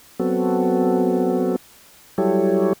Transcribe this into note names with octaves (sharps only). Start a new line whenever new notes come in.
F#3 B3 C4 F#4 A4
F#3 G3 E4 G4 A4 C#5